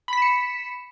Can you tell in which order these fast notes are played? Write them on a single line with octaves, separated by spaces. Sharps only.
B5 B6 E7 C#7